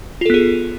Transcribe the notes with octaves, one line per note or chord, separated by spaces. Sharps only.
B3 F4 G#4 A4